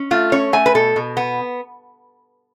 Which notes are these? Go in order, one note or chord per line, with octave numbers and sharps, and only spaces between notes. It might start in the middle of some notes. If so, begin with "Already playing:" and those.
Already playing: C#4
A3 F4
C#4 C#5
A3 G#5
B4
B2 A4
B2
B3